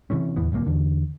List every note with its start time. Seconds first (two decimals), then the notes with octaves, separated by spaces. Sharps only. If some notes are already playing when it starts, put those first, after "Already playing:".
0.10 C3 E3 A3 C#4
0.36 D1 E2 E3 B3
0.52 D1 C2 D3 A#3
0.66 E2 D3